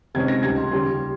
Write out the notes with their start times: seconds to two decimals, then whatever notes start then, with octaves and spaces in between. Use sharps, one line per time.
0.14 C3 D#3 G#3 C#4 G#6
0.28 A#6
0.43 C#2 C#3 G3 G#6
0.58 C6
0.71 D#2 C#3 G3 C#4 C6